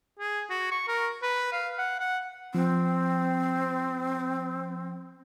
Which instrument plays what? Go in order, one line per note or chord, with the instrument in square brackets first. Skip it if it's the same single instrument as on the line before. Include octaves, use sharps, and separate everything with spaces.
[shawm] G#4
F#4
C#6
A#4
B4
F5
F#5
F#5
[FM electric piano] F3 [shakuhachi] C4